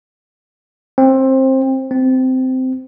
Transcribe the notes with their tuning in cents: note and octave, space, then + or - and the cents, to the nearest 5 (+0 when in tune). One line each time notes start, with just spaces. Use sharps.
C4 +20
C4 -15